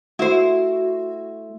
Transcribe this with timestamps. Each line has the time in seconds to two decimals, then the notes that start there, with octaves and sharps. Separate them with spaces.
0.19 A3 E4 F#4 C5